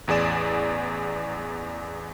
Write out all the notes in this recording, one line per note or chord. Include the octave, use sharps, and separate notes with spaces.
A1 E2 G#4 D5 E7